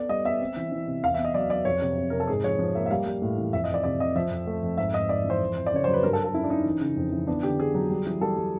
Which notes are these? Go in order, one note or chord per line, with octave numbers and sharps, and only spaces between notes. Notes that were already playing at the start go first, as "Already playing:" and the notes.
Already playing: B3 A4 D5
G3 D#5
B3 E5
C4
E3
E3
C3
E2 F5
E5
B3
D#5
F#3 D5
F#3 D5
F2 C#5
C3
C3
C3 A#4
A4
G#2 G#4
F3 C#5
F3
A#3 E5
E5
G3 F5
G3
A2
E3
F2 E5
D#5
F2 D5
C3 D5
C3 D#5
F3 E5
F2
A3
F2
G#2 E5
G#2 D#5
G#2 D5
E3
C5
F2
F2
D5
C#3 C#5
F#3 C5
B4
G2 A#4
A4
G2
A4
C#4 E4
D4
C#4 D#4
E3
C#3
F2
E3
B3 D4
D3 G4
B3 G#4
F#3
G3
E3
G3 A4
G3